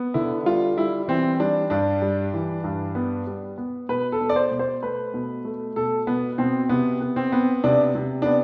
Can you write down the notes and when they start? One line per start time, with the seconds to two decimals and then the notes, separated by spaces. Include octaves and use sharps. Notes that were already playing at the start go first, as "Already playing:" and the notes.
Already playing: B3
0.14 D3 E4
0.46 G3 F4
0.77 G3 E4
1.08 E3 C4
1.39 G3 D4
1.70 G2 D4
2.02 G3
2.34 E3
2.64 G2
2.95 B3
3.27 G3
3.58 B3
3.89 B2 B4
4.12 A4
4.21 B2
4.29 D5
4.36 C5
4.51 B2
4.59 C5
4.83 A3 B4
5.14 B2
5.45 A3
5.76 B2 A4
6.07 B2 B3
6.38 B2 C4
6.69 C3 B3
7.01 B3
7.16 C4
7.32 B3
7.64 C3 D4
7.95 C3
8.22 B3 D4